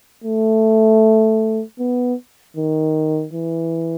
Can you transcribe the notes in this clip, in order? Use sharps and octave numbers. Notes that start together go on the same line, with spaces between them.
A3
B3
D#3
E3